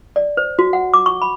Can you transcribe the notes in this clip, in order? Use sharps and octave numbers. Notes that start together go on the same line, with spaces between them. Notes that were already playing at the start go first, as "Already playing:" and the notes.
D5
C5
F#4
F#5
D6
C#6
B5